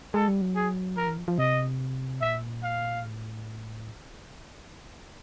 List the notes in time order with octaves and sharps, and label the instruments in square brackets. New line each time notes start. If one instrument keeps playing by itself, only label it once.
[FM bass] G#3 [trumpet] A4
[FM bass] G3
F#3
[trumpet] G#4
[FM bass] F3 [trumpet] A#4
[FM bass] E3
F3
F3
[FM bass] C3 [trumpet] D#5
[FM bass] A#2 [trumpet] E5
[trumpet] F5
[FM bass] A2